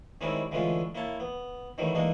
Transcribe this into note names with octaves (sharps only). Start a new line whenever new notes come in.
D#3 G3 G#3 C4 C#4 E4
D3 E3 G#3 A3 C#4 F4
A#3 E4 C#5 A5
B3
D#3 E3 F#3 G3 A3
E3 G#3 A#3 D4 D#4